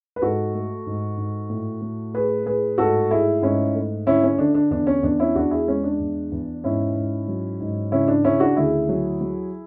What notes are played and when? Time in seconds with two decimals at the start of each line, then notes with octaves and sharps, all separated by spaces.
0.16 B4
0.21 G#2 F#4 A4
0.54 A3
0.86 G#2
1.17 G#2
1.50 A2
1.81 A2
2.14 A3 G#4 B4
2.46 A2 G#4 B4
2.78 G#2 F#4 A4
3.10 A3 E4 G#4
3.42 G#2 C#4 E4
3.75 A3
4.07 D3 C#4 E4
4.24 C#4
4.38 D3 D4
4.54 D4
4.71 E2 D4
4.87 C#4
5.03 E2 D4
5.20 C#4 E4
5.35 E2 D4 F#4
5.51 E4 G#4
5.67 G#3 C#4
5.84 D4
6.00 E2
6.32 E2
6.64 G#2 C#4 E4
6.96 G#2
7.28 F#3
7.61 G#2
7.92 C#3 C#4 E4
8.08 D4
8.24 C#3 C#4 E4
8.40 D4 F#4
8.56 D2 E4 G#4
8.89 F#3
9.21 F#3